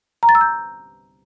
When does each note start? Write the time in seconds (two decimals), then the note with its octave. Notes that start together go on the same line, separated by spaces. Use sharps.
0.23 A#5
0.29 A6
0.35 E6
0.41 G6